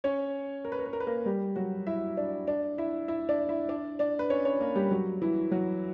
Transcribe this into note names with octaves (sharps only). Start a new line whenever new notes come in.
C#4 C#5
A#4
B4
A#4
B4
A#4
B4
A#3 A#4
G3 G4
F#3 F#4
E4 E5
D4 D5
D4 D5
E4 E5
E4 E5
D4 D5
E4 E5
D4 D5
D4 D5
B4
C#4 C#5
C#4 C#5
A#3 A#4
G3 G4
F#3 F#4
E3 E4
F#3 F#4